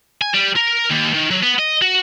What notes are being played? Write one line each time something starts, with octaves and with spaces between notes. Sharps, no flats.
G#5
G3
A#4
D#2
D#3
F#3
B3
D#5
F#4